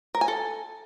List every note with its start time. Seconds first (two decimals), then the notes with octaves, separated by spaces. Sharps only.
0.15 A#4
0.21 G#5
0.28 A4